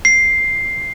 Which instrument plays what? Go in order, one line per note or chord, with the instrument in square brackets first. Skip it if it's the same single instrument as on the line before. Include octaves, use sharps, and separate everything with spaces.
[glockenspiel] C7